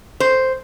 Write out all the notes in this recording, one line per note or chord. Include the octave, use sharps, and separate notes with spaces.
C5